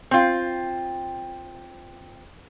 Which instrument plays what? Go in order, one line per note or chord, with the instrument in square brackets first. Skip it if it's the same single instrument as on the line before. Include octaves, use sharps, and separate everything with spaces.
[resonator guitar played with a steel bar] C4 F4